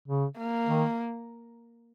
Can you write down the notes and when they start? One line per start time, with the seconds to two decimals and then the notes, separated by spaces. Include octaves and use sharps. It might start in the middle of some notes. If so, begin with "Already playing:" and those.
0.08 C#3
0.38 A#3
0.66 D#3